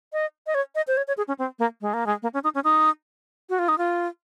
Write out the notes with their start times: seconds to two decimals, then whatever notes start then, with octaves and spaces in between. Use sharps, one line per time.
0.13 D#5
0.47 D#5
0.55 C#5
0.75 D#5
0.87 C5
0.97 C#5
1.08 C#5
1.17 G#4
1.28 C#4
1.39 C4
1.59 A#3
1.81 G#3
1.94 A#3
2.06 G#3
2.22 A#3
2.34 C#4
2.44 D#4
2.55 C#4
2.64 D#4
3.50 F#4
3.59 F4
3.68 D#4
3.78 F4